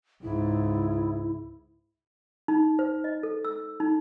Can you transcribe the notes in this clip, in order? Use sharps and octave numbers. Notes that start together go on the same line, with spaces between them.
C#2 G#2 E4
D#4
C5
D#5
A4
E6
D#4